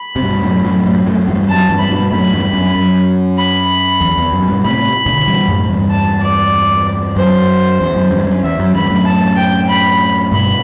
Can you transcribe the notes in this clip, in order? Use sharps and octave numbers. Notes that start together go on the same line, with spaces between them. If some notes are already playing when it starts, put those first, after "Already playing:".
Already playing: B5
C3
G2 B2
F#2 A2
F#2 A2
F#2 A2
F#2 A2
E2 G2
F#2 A5
E2 G2
B5
G2 B2
F#2 A2 B5
E2 G2
F#2
F#2
B5
E2
E2
F#2
G2 B2
A2 C3 B5
B2 D3
E3 G3
F#2 A2
E2 G2
A5
D5
F#2 C5
E2
F#2
E2 G2
F#2
E2 E5
F#2
E2 G2 B5
F#2 A2
A5
G5
B5
G2 B2 B5